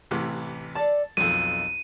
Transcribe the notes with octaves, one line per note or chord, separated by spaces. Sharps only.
A1 C3 E3
A4 D5 A5
B1 F2 A#3 D#4 D#7